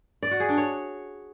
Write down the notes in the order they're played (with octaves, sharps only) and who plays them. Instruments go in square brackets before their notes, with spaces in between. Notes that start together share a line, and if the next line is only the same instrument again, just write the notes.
[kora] D5
F#4
G#4
D4
C#5